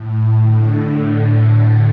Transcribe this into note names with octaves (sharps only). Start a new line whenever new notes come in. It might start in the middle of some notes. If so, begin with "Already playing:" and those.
Already playing: A2
D3